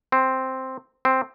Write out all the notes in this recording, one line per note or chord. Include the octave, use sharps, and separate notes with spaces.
C4
C4